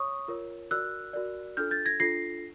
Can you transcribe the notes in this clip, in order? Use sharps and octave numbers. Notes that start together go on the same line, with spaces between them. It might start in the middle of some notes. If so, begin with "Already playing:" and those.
Already playing: C#5 C#6 D#6
F4 A#4 C#5
F#4 A#4 D5 E6 F#6
F#4 A#4 D5
D4 F4 A4 F6 G6
G6 A6
G#6 A#6
D4 F4 A4 A#6 C7